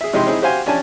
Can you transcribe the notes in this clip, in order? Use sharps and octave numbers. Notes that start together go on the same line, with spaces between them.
G#4 E5
C3 G#3 D#4 E4 G4 C6
C4 D#4 E4 G#4
F#4 G4 C5 F5 G#5
C#4 D4 G4 G#5 A5